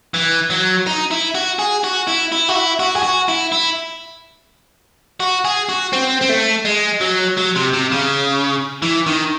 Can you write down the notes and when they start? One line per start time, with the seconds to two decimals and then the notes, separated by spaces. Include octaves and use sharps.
0.14 E3
0.50 F#3
0.87 D#4
1.11 E4
1.35 F#4
1.59 G#4
1.84 F#4
2.07 E4
2.32 E4
2.49 F#4
2.56 E4
2.80 F#4
2.96 G#4
3.03 F#4
3.28 E4
3.52 E4
5.20 F#4
5.45 G#4
5.69 F#4
5.93 C4
6.21 C4
6.29 A3
6.65 G#3
7.01 F#3
7.37 F#3
7.55 C3
7.73 C3
7.92 C#3
8.82 E3
9.06 D#3